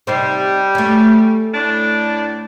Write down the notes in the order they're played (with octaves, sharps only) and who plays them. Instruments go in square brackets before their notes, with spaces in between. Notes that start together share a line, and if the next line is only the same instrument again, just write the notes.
[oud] C3 D#4 C5 [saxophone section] G3
[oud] A3 C#4
[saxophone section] A2 D4